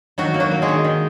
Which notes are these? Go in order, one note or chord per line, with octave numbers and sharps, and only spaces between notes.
D#3 F#3 F#4
A#3
F#3 F#4
A#3
G#3 G#4
D#3
D#3